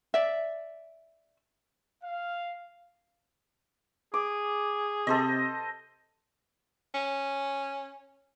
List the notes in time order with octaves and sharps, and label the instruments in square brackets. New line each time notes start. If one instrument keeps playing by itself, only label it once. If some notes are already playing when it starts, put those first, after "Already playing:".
[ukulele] D5 E5
[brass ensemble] F5
[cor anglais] G#4 [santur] D6
[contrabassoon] C3 [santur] A4 C5 D#5
[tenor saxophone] C#4